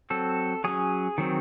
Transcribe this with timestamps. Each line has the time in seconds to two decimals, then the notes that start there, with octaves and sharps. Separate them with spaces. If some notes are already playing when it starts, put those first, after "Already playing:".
0.10 F#3 C4 A4
0.64 F#3 C#4 G#4
1.18 D#3 F#3 C4